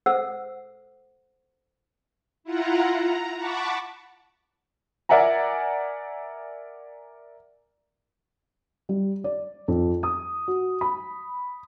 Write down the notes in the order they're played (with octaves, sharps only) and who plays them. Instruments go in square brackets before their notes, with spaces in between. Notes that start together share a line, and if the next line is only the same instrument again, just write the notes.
[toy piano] A4 C5 F#5 E6
[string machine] E4 F4 F#5 A#5
A#5
F#5 A5 B5 C#6 D6
[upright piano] A#4 D5 E5 F#5 G#5 A#5
[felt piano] G3
D5
F2
D#6
F#4
B5